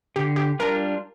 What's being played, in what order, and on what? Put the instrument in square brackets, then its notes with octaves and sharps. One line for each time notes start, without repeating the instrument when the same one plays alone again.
[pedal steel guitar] D3 [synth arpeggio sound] G4
[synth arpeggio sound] G4
[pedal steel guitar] G3 D4 F4 [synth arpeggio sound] A#4